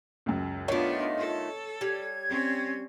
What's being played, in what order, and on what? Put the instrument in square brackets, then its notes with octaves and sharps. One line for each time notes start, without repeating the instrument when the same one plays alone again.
[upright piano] C#2 F#2
[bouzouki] D#3 A3 [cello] B3 D4 [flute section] F4 D#5 [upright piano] C#5
[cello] A4
[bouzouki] G3 [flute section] G#6
[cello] C4 C#4